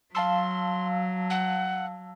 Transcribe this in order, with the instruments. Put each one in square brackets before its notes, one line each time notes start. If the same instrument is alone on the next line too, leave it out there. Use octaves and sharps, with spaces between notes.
[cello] F#3 [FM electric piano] F5 A5 E6 [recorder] C6
[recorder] F#5